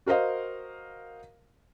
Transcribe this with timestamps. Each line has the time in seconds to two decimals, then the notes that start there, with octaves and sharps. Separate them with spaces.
0.06 F#4 A#4 C5 D#5 F5